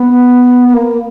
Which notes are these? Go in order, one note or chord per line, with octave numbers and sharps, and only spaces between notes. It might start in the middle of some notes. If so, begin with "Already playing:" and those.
Already playing: B3
B3
A#3